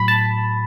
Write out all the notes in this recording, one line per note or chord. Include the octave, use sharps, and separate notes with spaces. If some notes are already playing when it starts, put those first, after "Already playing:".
Already playing: A2 F#3 B5
A5